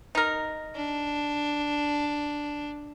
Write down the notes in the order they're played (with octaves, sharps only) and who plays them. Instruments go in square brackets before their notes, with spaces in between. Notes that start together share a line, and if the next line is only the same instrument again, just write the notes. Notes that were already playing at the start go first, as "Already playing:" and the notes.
[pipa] D#4 A#4
[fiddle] D4